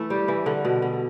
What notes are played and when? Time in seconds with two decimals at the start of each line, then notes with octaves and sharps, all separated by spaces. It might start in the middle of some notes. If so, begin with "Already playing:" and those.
Already playing: E3 A3 E4 A4
0.10 G3 G4
0.28 E3
0.46 D3
0.65 B2
0.82 D3